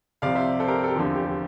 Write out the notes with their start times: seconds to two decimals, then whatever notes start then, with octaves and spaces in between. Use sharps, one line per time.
0.22 C2 C3 F3 D5 F5
0.35 C5 E5
0.60 A4 C5
0.68 G4 A#4
0.84 A4
0.88 G4
0.96 F1 E2 D3 F3
1.15 G4